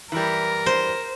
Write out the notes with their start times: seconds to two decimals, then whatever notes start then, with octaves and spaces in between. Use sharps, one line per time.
0.12 E3 G3 A#4
0.66 C5